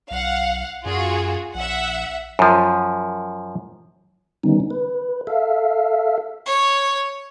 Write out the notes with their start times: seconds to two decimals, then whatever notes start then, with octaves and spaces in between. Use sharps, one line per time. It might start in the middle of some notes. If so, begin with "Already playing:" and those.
0.11 B1 F5 F#5
0.86 F#2 F4 F#4 G#4
1.54 A#1 E5 F#5
2.39 F#2 F3
4.43 D3 D#3 G3 B3 C#4 D#4
4.71 B4
5.27 A4 E5 F5
6.46 C#5